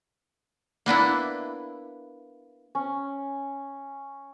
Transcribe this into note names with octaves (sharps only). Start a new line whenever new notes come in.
A#3 B3 D4 E4
C#4